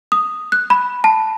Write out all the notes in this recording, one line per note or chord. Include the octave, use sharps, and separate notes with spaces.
D#6
F#6
B5
A5